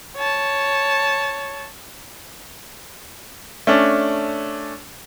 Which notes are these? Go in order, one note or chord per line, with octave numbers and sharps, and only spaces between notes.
C#5 A5
A3 C#4 D4